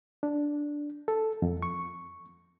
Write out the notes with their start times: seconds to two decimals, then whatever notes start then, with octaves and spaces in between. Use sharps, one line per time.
0.23 D4
1.08 A4
1.42 F2
1.62 C#6